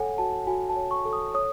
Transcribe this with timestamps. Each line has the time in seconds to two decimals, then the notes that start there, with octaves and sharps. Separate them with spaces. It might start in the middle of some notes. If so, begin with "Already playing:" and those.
Already playing: A4 C#5 F#5 G#5
0.18 F#4 A5
0.47 F#4 G#5
0.69 A5
0.76 C#5
0.91 C#6
1.05 A4
1.13 D#6
1.34 C#5 D#6